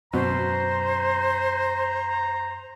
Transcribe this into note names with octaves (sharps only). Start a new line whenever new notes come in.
F#2 B2 C5 A#5